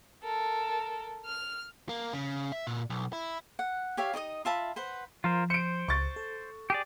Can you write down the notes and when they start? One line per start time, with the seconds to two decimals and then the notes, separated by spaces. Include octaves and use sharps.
0.23 A4 A#4
1.25 F6 F7
1.89 A#3
2.13 C#3
2.52 E5
2.67 A#2
2.90 B1
3.13 E4
3.59 F#5
3.97 G4 C#5 E5 F5
4.13 D#4 D5 D#5 D#6
4.45 F4 E5 A5 B5
4.76 B4 C5 F#5
5.24 F3 F4 A#4 C5
5.50 C5 C#7 D7
5.88 C#2 C#6 A6
6.16 A4
6.70 G4 G#4 D5